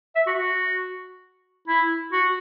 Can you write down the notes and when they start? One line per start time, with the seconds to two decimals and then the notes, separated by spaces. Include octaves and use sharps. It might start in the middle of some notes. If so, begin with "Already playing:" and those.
0.16 E5
0.27 F#4
0.37 F#4
1.68 E4
2.13 F#4